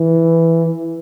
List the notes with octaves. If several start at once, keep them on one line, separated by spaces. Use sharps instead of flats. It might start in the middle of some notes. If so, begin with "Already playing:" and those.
Already playing: E3